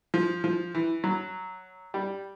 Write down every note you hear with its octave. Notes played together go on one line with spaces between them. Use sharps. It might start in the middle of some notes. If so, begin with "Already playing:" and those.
F3
F3
E3
F#3
G3